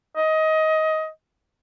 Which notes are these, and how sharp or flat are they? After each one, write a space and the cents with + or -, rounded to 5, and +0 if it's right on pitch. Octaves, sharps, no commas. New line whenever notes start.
D#5 +20